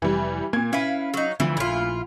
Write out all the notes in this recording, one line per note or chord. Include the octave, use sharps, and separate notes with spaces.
F1 E3 G3
A#2 A#3 G#6
C#4 E4 B4 F5
F#3 D#4
D2 D3 E3 F3
A#1 E4 F4